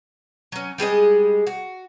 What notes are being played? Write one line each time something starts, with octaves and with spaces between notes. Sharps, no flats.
F#3 C#4
G3 G#3 G#4 D#5
F#4